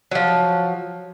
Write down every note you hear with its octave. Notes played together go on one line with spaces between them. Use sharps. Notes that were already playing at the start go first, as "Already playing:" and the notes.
F3 F#3